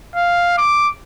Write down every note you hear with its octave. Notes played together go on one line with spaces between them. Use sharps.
F5
D6